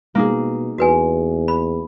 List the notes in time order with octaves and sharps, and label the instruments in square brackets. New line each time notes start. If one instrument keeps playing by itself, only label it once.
[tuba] B2 [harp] A#3 D#4 G#4
[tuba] E2 [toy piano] F#4 B4 G#5
[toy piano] B5